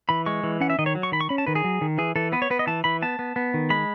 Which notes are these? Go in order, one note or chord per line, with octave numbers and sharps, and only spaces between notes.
E3 B5
G#3 C#6
E3
C#4 F#5
E5
D#3 D#5
C#5
F#3
C#6
D#3 B5
C#6
C#4 B5
A5
D#3 B4
G#4
F#3
D#3
E3 G#4
E3 A4
B3 B4
C#5
B3 B4
D#5
E3 A5
E3 B5
B3 A5
B3
B3
D#3
G#3 B5